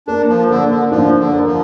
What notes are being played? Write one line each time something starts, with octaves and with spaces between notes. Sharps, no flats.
A#3 D4
F3
D3 A#3
D3
F3 D4
D3
A#4
F3